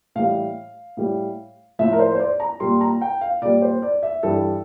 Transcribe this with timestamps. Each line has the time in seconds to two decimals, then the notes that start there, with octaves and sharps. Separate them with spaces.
0.16 A2 E3 G3 F5
0.97 A2 G3
1.79 A2 F3 E5
1.93 A#4
1.99 C5
2.15 C5
2.19 D5
2.40 A#5
2.60 A#2 G3 C6
2.81 A#5
3.01 G5
3.21 F5
3.42 A#2 G3 D5
3.62 C5
3.82 D5
4.03 E5
4.23 G2 E3 G3 A4